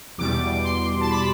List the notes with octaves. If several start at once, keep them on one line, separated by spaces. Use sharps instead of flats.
E2 B2 G3 D6
C6
A5
B5